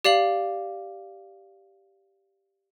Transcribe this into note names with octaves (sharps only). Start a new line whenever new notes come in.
G4 D5 F5 F#7